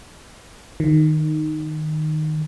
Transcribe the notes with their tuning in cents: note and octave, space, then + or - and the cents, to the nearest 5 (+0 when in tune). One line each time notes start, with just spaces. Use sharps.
D#3 -10